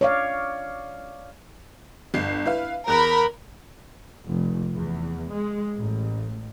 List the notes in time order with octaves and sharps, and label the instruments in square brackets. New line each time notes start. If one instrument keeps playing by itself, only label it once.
[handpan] C#5 D5 F5
[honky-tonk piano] G1 C7
E4 B4 F5
[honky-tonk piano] E2 F#6 [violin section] A#4 B5
[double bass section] F1
E2
G#3
A1